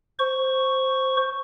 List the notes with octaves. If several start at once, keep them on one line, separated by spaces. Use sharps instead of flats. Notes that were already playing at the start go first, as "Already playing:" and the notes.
C5 C#6